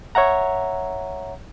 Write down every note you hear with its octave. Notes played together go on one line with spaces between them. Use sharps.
C#5 E5 F#5 A#5